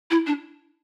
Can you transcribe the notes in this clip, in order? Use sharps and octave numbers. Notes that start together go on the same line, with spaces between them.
E4
D4